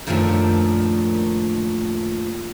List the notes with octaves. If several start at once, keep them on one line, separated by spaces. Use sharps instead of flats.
F#2 A#2 D#3 F3 A3 D4